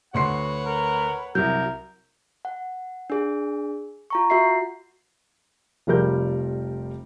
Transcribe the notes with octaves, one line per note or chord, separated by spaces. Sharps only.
D2 F#4 B4 C#5 F#5 C6 C7
A#4
C2 F#3 A#4 G6
F#5
D4 G#4
F4 A#5 C#6
F#4 E5 C7
F1 F3 G3 A#4 G6